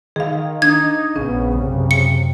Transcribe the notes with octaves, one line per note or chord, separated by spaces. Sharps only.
D#3 G#4 F5
D4 D#4 G#6
A#1 C#3 B3 C#4
F#2 C3
C#7